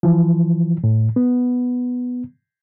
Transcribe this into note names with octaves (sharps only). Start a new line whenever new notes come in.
E3 F3
A2
B3